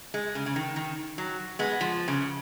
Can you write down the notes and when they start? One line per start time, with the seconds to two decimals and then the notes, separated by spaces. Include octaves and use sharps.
0.14 G#3
0.35 C#3
0.46 C#3
0.56 D#3
0.76 D#3
1.18 F#3
1.59 G#3 B3
1.81 F3
2.08 C#3